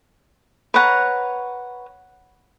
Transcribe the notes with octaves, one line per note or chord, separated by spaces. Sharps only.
B4 C#5 F#5 A#5